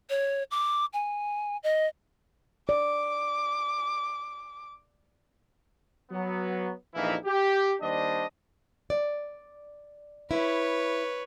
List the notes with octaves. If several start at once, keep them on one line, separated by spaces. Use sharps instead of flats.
C#5
D6
G#5
D#5
D5 D6
F#3 B3
A#1 F2 E3 D#4 E4 F5
G4
D#2 G3 D4 C5 D#5
D5
E4 B4 C#5